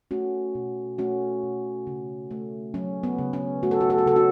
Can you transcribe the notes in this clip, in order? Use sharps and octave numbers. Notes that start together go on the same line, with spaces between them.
A3 C#4 F#4
B2
A3 C#4 F#4
B2
C#3
A3
F#3 C#4
B3
C#3
C#4
A3 F#4
A4
F#4
A4
F#4
C#3 A4
C#4 F#4